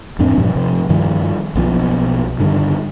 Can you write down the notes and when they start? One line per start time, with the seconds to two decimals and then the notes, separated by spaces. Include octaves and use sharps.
0.19 E2 G#2 C4 D4
0.37 G2 A#2 F3
0.56 C3 F3
0.89 G2 D#3 F3
1.55 B1 B2 E3 F3
2.39 G2 D3 D#3